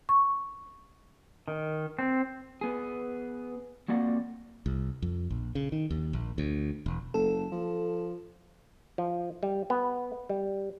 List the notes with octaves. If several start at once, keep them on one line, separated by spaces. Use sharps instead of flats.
C#6
D#3
C4
B3 G#4
F2 A#3 F#4 D5 F#5
C2
F2
A#1
C#3
D#3
D#2
A#1
D2
E1
F#1 A4
F3
F3
G3
B3
G3